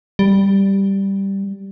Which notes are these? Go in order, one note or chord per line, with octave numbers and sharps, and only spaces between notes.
G3